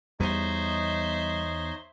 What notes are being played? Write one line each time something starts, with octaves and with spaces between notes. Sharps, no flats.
E2 G3 B3 D#4 C5 C#5 D#5 E5